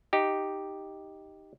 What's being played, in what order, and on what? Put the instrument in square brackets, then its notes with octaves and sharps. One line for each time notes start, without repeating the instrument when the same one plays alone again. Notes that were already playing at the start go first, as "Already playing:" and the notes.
[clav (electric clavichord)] D#4 G4